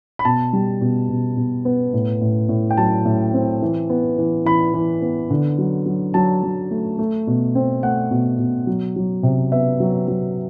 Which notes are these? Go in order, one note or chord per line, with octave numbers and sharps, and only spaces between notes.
B5
B2 A5
G3
B2
B2
B2
B3
A2
A2
A2
G5
F#3 A5
A2
C4
E3
B3
E3
E3 B5
E3
B3
D3
F#3
F#3
F#3 A5
F#3
A3
A3
B2
C4
A3 F#5
B2
B2
F#3
F#3
C3
B3 E5
F#3
F#3